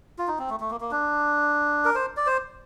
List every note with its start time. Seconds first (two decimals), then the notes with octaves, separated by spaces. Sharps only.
0.18 F4
0.28 D#4
0.39 C4
0.50 A3
0.60 A3
0.70 A#3
0.81 A#3
0.91 D4
1.85 A#4
1.95 C5
2.17 D5
2.26 C5